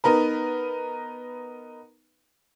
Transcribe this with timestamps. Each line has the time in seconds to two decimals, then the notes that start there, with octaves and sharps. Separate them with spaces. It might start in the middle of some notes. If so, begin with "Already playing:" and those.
0.04 B3 D#4 A#4 B4